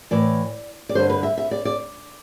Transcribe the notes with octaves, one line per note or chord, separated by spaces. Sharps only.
A2 E3 D5
D5
G2 D3 C5
B4
E5
E5
D5
D5